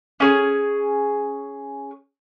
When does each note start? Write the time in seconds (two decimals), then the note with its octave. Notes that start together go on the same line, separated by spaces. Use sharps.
0.20 C#4 G#4